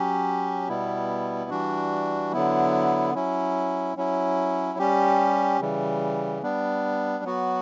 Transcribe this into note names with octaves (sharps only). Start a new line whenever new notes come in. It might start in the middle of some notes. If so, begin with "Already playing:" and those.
Already playing: F#3 C#4 G4
B2 G3 B3 E4
E3 G3 D4 F#4
D3 F#3 B3 E4
F#3 C#4 E4
F#3 C#4 E4
G3 C#4 G4
C#3 E3 G3
G3 B3 D4
F#3 B3 F#4